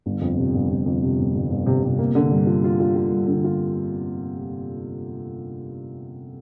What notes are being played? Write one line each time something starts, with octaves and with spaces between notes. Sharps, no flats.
G1
F2
C3
G1
G1
F2
C3
G1
G1
G1
C3
C3
A#3
D3
G2
F4
F4
F4
F4
G2
D3
F4